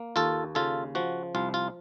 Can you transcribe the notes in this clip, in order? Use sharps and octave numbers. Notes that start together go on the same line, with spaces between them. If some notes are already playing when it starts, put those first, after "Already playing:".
Already playing: A#3
D#2 F4 A4
C#3 F4 A4
F3 F#4
C2 F4
F4